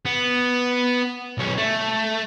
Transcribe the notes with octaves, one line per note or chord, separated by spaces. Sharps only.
B3
B1 C#4
A3